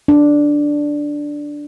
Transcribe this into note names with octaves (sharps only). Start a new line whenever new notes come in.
D4